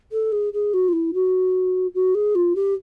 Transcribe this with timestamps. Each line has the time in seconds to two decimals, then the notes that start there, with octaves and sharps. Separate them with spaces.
0.12 A4
0.32 G#4
0.53 G#4
0.74 F#4
0.88 F4
0.93 E4
1.14 F#4
1.95 F#4
2.15 G#4
2.35 F4
2.56 G4